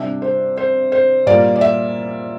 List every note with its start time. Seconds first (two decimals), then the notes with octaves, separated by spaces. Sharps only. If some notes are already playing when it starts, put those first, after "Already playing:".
Already playing: C3 G3 D4 G4 E5
0.22 C5
0.57 C5
0.92 C5
1.26 A#2 G3 A#3 D5
1.56 D5
1.61 E5